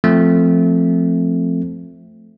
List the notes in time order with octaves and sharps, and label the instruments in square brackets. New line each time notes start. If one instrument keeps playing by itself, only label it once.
[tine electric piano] F3 A3 C4